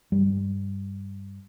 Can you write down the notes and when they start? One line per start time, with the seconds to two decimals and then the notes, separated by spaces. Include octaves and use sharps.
0.12 G2 G3